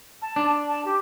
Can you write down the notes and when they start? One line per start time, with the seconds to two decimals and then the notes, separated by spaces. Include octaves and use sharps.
0.22 A5
0.36 D4
0.68 A5
0.85 G4